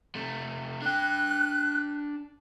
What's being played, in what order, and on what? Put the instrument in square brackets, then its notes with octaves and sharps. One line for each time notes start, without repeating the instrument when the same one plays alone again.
[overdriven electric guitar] C3 A3
[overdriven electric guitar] D4 G5 [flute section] F#6